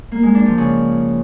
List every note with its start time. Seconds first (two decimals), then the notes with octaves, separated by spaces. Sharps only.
0.12 A#3
0.23 G#3
0.35 D4
0.46 F3
0.58 C#3